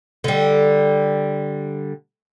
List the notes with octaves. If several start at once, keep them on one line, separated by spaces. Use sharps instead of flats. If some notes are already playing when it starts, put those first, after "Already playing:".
D3 G3